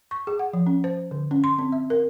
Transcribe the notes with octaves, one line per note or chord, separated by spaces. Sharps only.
C#6
G#4
F#5
F3
C#4
C5
D3
C#4
C6
C4
E5
A#4